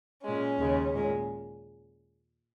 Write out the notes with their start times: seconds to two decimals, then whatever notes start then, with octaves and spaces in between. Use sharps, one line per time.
0.24 A#2 G#3 C#4
0.59 D#2 C#3 G#3
0.95 A#2 G#3